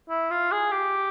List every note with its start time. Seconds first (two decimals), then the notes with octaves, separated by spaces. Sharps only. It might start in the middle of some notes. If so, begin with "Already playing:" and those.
0.09 E4
0.30 F4
0.52 G#4
0.72 G4